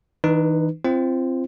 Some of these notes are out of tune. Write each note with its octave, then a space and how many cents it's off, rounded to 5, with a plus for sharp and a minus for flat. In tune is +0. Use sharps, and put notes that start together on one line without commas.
E3 -45 D#4 -30 B4 +0
C4 +0 F4 -35 C5 +0